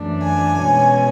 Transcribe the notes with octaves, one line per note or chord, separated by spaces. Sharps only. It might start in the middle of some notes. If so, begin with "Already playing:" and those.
Already playing: F#2 E3 A3 D4
G#5
B2 G#3 C#4